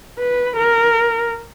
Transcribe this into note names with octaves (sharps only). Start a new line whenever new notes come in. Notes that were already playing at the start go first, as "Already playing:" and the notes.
B4
A#4